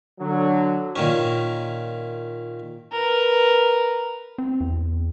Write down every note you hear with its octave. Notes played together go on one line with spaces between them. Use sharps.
D3 F#3
A#2 D#3 C#4
A#4 B4
C4
E2